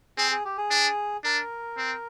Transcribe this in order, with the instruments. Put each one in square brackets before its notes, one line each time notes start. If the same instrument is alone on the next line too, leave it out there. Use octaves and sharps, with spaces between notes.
[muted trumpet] C4 [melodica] G#4
[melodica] G#4
G4
G#4
[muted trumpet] D4
[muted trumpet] D4 [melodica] A#4
[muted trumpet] C4